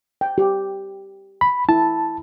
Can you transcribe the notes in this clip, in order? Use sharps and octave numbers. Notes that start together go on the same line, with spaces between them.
G5
G4
B5
E4 A5